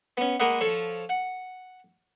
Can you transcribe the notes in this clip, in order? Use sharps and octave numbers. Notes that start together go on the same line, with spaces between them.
B3 C#4
G#3 A#3 A#4 B4 D#5 F#5
F3 A4 C#5
F#5